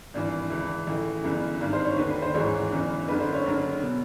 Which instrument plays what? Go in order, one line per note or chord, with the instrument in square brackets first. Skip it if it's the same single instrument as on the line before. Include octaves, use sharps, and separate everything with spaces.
[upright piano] G#1 G2 E3
C#2 C#3 E3
A1 A2 E3
G1 F#2 C#3 E3
G#1 G2 D#3
C5
C#5
D#2 D3 B4
B4
C5
A1 G#2 E3 C#5
G1 F#2 C#3 E3
F#1 F#2 D3 B4
C5
C#5
F#1 F#2 D3
B2